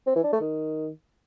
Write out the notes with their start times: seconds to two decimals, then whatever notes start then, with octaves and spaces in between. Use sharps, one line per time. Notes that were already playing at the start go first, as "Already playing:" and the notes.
0.07 C4
0.16 E3
0.24 D4
0.33 A3
0.41 D#3